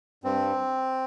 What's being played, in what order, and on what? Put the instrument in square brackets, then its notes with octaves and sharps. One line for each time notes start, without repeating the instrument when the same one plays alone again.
[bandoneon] G2 C4